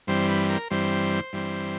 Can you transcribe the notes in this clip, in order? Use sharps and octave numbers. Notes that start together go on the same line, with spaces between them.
G2 E3 G3 C4 C5
B4
A#4
G2 E3 G3 C4 C5
G2 E3 G3 C4